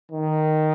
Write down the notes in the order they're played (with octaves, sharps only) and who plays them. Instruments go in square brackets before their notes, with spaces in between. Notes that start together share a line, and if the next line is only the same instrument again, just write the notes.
[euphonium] D#3